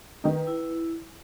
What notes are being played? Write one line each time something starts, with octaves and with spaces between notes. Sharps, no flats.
D#3 D#4 B4
E4